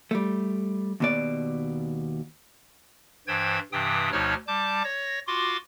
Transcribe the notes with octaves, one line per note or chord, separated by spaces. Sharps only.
G3 A3
D#2 B2 D5
G2 E3 C5 G5 G#6
G2 C3 E3 G5 D#6
D2 B2 F3 D#4 C#5 F6
G3 A5 D6 G6
C#5 A#6
F4 F#4 C6 D6